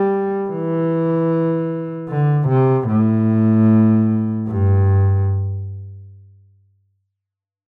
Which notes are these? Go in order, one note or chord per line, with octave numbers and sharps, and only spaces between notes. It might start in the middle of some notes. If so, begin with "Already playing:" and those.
Already playing: G3
E3
D3
C3
A2
G2